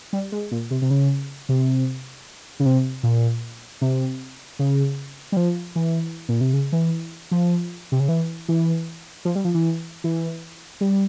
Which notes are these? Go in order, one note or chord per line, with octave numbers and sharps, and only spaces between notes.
G3
G#3
A#2
C3
C3
C#3
C3
C#3
C3
A#2
C3
C#3
G3
F3
E3
A#2
C3
C#3
E3
F3
C3
C#3
E3
E3
F3
G3
F3
E3
E3
G3